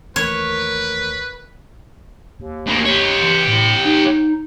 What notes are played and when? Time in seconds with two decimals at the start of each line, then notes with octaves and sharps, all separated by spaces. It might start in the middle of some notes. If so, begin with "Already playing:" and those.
0.16 D#2 E3 A3 A#4 B4 C#5
2.40 D#2
2.66 D2 A#3
2.85 G4 C#5
3.22 E3
3.48 A2
3.85 D#4